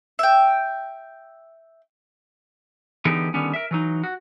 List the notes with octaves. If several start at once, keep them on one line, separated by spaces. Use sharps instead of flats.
E5 G5
D3 E3 B3 D#4 G4 G#4
D3 D#3 G3 B3 C#4
A#4 E5
E3 F#3 D#4
F#4